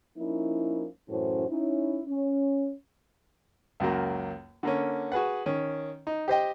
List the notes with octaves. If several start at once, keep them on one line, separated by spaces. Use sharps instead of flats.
F3 A#3 C#4 D#4 E4
F#2 A2 E3 C#4 F#4 C5
C#4 D#4 E4
C#4
C#2 F#2 F#3 A#3
D3 A#3 C#4
F#4 G#4 B4 F#5
D#3 C#4
D#4
G4 C5 D#5 G5